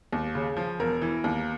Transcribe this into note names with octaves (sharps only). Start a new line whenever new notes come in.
D#2
C#3
F3
E1 A#4
E3
D#2